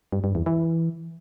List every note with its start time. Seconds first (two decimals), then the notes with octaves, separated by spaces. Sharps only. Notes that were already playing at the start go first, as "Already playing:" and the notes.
0.12 G2
0.24 G2
0.35 E2
0.46 E3